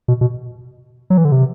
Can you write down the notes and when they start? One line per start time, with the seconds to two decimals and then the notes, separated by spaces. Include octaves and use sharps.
0.08 B2
0.21 B2
1.10 F#3
1.18 E3
1.25 D3
1.32 C3